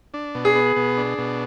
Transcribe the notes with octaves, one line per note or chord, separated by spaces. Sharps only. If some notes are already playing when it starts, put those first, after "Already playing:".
D4
B2
G#4
B3
B2
D4
B2